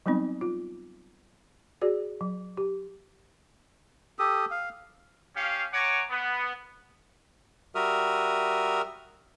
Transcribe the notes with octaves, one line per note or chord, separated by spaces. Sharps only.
F#3 G3 B3 C4 D#4
F4
F#4 G#4 D5
F#3
G4
G4 A4 D#6
F5
C#4 G4 F5
C#5 F#5 G#5 A#5 D6
B3
G3 F#4 A#4 E5 D#6 F6